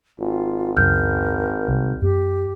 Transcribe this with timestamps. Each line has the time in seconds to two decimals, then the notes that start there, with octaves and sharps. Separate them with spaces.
0.19 G#1 F4
0.77 C#2 F#2 C#3 A#4 F6 G6
1.68 C2
2.02 F#2 B3 G4